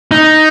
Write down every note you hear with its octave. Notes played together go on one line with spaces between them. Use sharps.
D#4